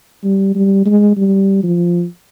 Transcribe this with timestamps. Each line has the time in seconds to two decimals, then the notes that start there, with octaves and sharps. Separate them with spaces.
0.24 G3
0.55 G3
0.85 G#3
1.17 G3
1.63 F3